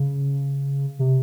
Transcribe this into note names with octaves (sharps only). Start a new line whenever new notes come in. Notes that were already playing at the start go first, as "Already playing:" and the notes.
Already playing: C#3
C3